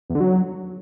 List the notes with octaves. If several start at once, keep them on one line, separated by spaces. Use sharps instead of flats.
E2
D3
F#3